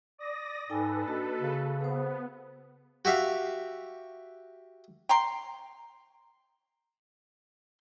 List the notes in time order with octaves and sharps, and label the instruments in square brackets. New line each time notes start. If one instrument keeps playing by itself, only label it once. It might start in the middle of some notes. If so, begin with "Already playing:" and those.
[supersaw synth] D5 D#6 A#6
[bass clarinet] G#2 [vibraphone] D#4 G5 G#5 [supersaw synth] A4 B4
[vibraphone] A#3 F#4 D#5 [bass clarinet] D4
[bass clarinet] C#3
[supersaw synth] B3 [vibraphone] G#4 C5
[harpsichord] F#4 G4 E5 F5
[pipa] G5 A#5 C6